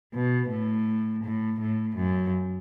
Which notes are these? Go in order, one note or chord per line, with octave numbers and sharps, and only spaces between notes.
B2
A2
A2
A2
F#2